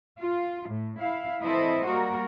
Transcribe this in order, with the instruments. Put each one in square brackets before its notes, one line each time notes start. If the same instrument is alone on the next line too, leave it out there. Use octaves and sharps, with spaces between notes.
[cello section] F4
A2
E4 F5
E3 C4 E4 A4 C5 D#5
G3 A#3 F#4 A#4